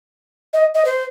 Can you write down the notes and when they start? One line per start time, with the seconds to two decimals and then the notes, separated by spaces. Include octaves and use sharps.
0.53 D#5
0.74 D#5
0.85 C5